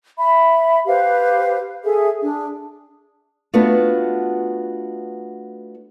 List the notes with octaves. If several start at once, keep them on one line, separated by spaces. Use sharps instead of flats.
E5 B5
G4 B4 C5 F5
G#4 A4 E5
D4 G#4
A3 B3 D4 F4 F#4